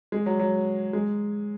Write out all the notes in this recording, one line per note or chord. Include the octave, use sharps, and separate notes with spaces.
G#3
F#3
F#3
G#3